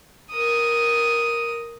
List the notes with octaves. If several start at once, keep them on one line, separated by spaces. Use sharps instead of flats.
A#4 D#6